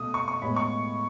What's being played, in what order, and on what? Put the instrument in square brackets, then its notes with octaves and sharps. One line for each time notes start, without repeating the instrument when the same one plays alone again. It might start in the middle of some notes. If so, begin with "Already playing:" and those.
Already playing: [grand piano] B2 A3 D#6
C#6
C#6
A2 G#3 B3 B5
C#6